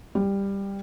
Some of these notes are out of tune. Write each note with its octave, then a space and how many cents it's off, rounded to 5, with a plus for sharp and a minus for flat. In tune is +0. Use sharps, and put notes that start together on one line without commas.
G3 +10